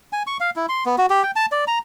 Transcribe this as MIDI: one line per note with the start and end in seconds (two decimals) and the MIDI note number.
0.13 0.23 80
0.27 0.37 85
0.40 0.50 77
0.56 0.66 64
0.69 0.84 84
0.86 0.96 59
0.98 1.06 66
1.10 1.23 67
1.23 1.31 79
1.36 1.46 81
1.52 1.65 74
1.67 1.79 82